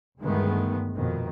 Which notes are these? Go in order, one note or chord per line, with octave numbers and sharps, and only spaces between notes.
D2 G2 D#3 G#3 A3 B3
A#1 F2 B2 D3 D#3